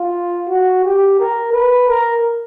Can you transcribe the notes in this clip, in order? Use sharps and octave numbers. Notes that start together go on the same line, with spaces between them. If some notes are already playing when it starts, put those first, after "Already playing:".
Already playing: F4
F#4
G4
A#4
B4
A#4